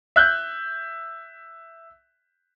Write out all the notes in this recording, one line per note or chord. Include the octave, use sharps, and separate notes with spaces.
E5 F#6 G6